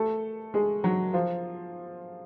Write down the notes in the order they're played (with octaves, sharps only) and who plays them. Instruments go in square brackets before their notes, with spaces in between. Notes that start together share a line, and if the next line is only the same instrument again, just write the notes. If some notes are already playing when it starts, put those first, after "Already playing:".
Already playing: [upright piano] A3 A4
G#3 G#4
F#3 F#4
F3 F4